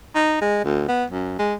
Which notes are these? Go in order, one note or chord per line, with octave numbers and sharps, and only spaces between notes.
D#4
G#3
D2
B3
F#2
G#3